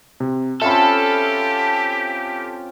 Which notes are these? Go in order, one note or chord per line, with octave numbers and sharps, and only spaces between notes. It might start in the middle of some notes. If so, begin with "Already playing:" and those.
C3
C4 C#4 F4 G4 A4 E5 B5